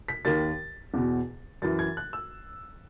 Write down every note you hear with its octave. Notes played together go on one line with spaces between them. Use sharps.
B6
D#2 D#3 A6
E2 B2
F#2 E3 A6
G#6
F#6
E6